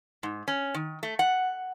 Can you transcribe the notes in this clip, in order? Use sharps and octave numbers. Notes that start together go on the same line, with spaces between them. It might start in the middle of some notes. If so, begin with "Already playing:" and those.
G#2
C#4
D#3
A3
F#5